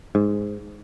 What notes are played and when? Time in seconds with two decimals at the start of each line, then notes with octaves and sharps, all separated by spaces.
0.15 G#2